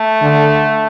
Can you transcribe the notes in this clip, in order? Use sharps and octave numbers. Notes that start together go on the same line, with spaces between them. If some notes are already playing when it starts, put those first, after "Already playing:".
Already playing: A3
D3